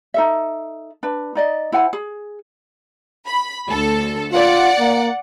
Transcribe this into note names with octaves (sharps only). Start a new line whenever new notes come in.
D#4 A4 E5
D4 B4
D#4 D5 D#5
E4 C5 F#5 G#5
G#4
B5
D2 A4
F4 D5 F#5
A#3